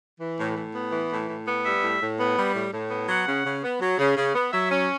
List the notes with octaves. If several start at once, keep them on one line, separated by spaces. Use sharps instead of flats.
E3
A2
A2
B3
E3
A2
A2
B3
G3 E5
A2
A2
B3
G3
A2
A2
B3
F#3 F#5
C#3
C#3
B3
F#3
C#3
C#3
B3
F#3 E5
C#4